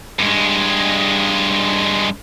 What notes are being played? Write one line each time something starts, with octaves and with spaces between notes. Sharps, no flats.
G2 G#3